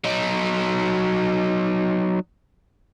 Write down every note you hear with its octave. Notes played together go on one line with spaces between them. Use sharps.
F#3 D#4